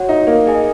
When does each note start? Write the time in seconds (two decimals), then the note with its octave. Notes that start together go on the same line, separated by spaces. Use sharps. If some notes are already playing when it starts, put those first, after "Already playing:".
Already playing: F#4 C#5 F#5
0.09 D#4
0.27 A#3
0.46 G#4 D#5 G#5